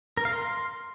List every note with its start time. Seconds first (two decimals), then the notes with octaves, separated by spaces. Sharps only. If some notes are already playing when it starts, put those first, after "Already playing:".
0.17 A#4
0.25 F5
0.33 C6